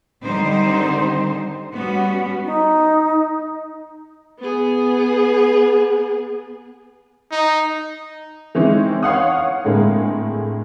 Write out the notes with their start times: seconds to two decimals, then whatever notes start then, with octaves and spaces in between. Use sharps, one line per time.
0.24 D3 D#3 G3 C4 D#4 C5
1.75 G3 B3 C#4 F#4
2.45 D#4
4.39 B3 G#4
7.31 D#4
8.55 D#3 E3 G#3 C4 C#4 D#4
9.03 C#5 F5 F#5 D#6
9.65 A2 D3 G#3 A#3 C4